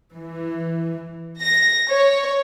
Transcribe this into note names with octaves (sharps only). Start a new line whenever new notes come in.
E3
A#6
C#5